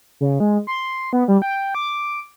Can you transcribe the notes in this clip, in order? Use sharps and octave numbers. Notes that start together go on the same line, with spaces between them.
C#3
G#3
C6
B3
G3
G5
D6